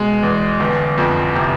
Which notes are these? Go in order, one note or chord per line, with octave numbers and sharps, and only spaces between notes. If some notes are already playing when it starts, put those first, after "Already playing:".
Already playing: B2 G#3
E2
G1
F2
C3